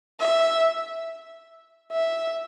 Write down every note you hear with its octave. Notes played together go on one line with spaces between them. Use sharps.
E5
E5